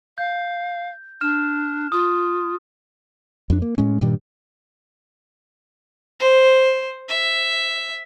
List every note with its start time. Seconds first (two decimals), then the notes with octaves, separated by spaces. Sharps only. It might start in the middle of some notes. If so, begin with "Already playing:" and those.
0.18 F5 G6
1.21 D4 F6 E7
1.92 F4 D#6
3.50 F2 D4
3.62 A#3
3.78 A2 G#3 C#4
4.01 G2 A#2 D#3 G3
6.20 C5
7.08 E5